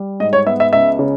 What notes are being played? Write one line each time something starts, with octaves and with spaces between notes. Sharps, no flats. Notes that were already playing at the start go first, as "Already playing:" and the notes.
Already playing: G3
G#2 D#5
C#5
B3 E5
E5
C#2 E5
C#3